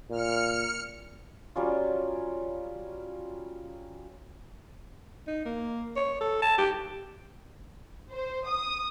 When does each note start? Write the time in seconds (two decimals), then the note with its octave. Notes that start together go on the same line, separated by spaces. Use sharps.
0.11 A#2 F6 C#7
1.56 F#3 G3 C#4 F4
5.27 D#4
5.45 A#3
5.96 C#5
6.21 A4
6.42 A5
6.58 G4
8.12 C5
8.48 D#6